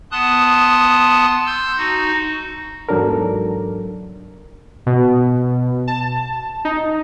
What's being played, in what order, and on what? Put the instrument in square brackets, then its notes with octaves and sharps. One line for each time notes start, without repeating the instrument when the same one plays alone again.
[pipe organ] B3 A5 C6 D#6 F#6
C6 E6 G6
D#4 F#4
[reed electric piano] E2 G#2 F#3 D4 A4 A#4
[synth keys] B2
A5
D#4